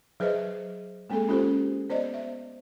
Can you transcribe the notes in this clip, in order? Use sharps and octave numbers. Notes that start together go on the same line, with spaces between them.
F#3 G#4 B4 C5 D#5 E5
G#3 A#3 C4 G#4 A4
C#4 F4 G4 A4 C5
B3 C5 D5 D#5
E5